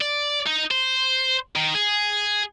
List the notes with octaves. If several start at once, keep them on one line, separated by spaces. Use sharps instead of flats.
D5
D#4
C5
D#3
G#4